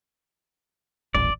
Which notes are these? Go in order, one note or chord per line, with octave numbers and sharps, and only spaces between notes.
D#1 A1 D5